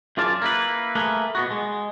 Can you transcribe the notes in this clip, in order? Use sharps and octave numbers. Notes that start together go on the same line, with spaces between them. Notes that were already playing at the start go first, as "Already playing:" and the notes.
F#2 F4 G#4 D5 F5 A5
A#3 E4 B4
A3 A#3 G#4 B4
B2 B3 F#4
G#3